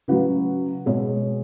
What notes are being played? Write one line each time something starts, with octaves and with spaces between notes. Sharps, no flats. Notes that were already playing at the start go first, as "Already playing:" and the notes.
C#3 F#3 F#4 B4
B2 G#3 G#4 C#5